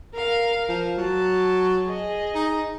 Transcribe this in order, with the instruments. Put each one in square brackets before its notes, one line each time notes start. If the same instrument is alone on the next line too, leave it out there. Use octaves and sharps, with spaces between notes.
[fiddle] A#4 F5
[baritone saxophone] F3
[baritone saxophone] F#3 [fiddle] A5
[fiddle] G#4 D#5
[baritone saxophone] D#4